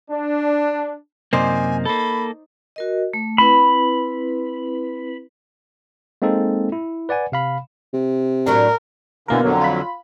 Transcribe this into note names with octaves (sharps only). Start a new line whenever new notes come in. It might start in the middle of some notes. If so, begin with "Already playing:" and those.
D4
F#2 C3 A#3 D#4 C5 D5 G#5
A#3 A4 B5
F#4 A#4 D#5
A3
C4 E4 B4 B5
G#3 A#3 C4 D#4 A4
E4
B4 D5 F#5 G#5
C3 F5 B5
C3
A2 F#3 D4 A#4
B2 D3 E3 A#3 A#4
F2 D3 F#3
F4 B5